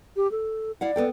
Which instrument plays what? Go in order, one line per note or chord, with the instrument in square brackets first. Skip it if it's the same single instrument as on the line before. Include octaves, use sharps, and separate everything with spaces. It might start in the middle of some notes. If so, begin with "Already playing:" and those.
[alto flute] G4
A4
[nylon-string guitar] E4 F5 F#5 [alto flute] D5
[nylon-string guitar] B3 A4 G5